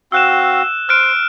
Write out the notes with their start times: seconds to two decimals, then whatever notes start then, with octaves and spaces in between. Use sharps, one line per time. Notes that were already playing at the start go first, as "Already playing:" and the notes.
0.12 C4 F#4 F5 E6 F#6 E7
0.89 C5 F6 F#6 D7